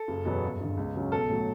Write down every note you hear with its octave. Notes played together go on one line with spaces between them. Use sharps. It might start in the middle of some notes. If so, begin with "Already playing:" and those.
Already playing: A4
F#1
E2 B2 F#3 B3
G1
G2 D3
C#2
C#3 F#3 C#4
B1 A4
A2 F#3